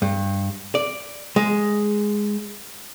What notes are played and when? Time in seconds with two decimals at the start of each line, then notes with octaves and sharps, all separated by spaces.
0.02 G2
0.75 D5
1.36 G#3